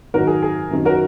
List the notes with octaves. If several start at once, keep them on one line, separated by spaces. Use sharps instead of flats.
G#2 D#3 F#3 F#4 A#4
G#4
G#4
F#2 D#3 F#3
F#4 A#4